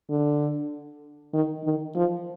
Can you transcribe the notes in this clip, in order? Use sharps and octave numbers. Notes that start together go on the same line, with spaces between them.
D3
D#3
D#3
F3